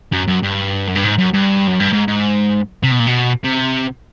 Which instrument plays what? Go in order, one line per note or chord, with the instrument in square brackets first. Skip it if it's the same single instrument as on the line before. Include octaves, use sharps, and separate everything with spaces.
[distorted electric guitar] F#2
F#2
G2
F#2
G2
G#2
F#2
G2
F#2
G2
G#2
G#2
C3
B2
A#2
B2
C3